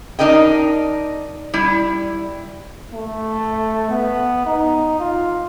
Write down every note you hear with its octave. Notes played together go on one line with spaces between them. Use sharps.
D4 D#4 A#4 D#5 G5
G3 E4
A3
B3
D#4
F4